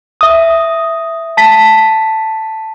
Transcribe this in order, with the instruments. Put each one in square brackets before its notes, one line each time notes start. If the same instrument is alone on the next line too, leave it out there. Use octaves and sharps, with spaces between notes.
[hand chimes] E5 D#6
A5 B6